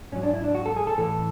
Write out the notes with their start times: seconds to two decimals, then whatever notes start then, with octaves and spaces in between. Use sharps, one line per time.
0.12 G#2 C#4
0.16 F#3
0.23 D4
0.33 E4
0.44 D4
0.55 F#4
0.66 A4
0.76 G#4
0.87 A4
0.98 A2 E3 A4